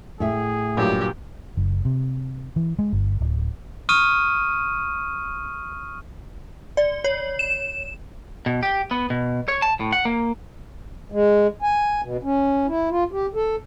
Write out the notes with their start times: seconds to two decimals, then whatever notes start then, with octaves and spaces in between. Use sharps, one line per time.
0.20 A2 G#4 E5
0.77 G2 A#2 F#3 G4
1.57 F#1
1.85 C3
2.56 E3
2.79 G#3
2.92 G1
3.20 D1
3.89 C#6 D#6 F6 D#7
6.77 D5
7.04 C#5
7.39 E7
8.46 B2
8.63 G4
8.91 B3
9.10 B2
9.48 C#5
9.62 A5
9.80 A2
9.92 F#5
10.05 A#3
11.12 G#3
11.62 G#5
12.03 B2
12.23 C#4
12.67 E4
12.90 F4
13.12 G4
13.35 A4